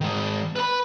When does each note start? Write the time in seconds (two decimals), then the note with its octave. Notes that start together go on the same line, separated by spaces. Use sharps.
0.01 D#3 G#3
0.56 B4 B5